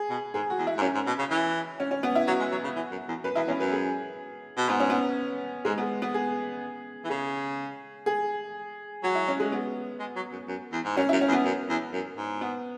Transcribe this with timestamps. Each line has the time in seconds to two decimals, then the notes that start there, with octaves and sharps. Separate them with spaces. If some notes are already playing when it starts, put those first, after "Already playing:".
Already playing: G#4
0.10 B2
0.34 G#2 G#4
0.50 F#4
0.59 E2
0.67 E4
0.78 G#2
0.82 F#2 C#4
0.95 G#2
1.07 B2
1.19 C#3
1.31 E3
1.80 C#4
1.91 C#4
2.03 B3
2.15 E4
2.27 F#3 F#4
2.40 G#3
2.52 F#3
2.64 C#3
2.76 E3
2.92 F#2
3.08 E2
3.24 F#2 B4
3.35 E2 E4
3.48 E2 C#4
3.60 F#2 B4
3.73 G#4
4.58 B2
4.69 G#2 B3
4.80 C#4
4.90 B3
5.65 G#2 G#3
5.78 B3
6.02 B3
6.14 G#4
7.04 E3
7.10 C#3 G#4
8.06 G#4
9.03 F#3 F#4
9.15 E4
9.28 C#4
9.40 G#3
9.52 B3
10.00 G#3
10.16 F#3
10.32 F#2
10.48 F#2
10.72 E2
10.85 G#2
10.97 F#2 C#4
11.09 E4
11.13 F#2
11.21 C#4
11.29 E2
11.32 B3
11.45 F#2
11.69 E2
11.93 F#2
12.17 G#2
12.41 B3